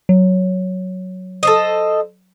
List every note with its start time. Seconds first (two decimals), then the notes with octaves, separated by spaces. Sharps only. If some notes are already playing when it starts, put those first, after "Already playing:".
0.09 F#3
1.43 A4 C5 D#5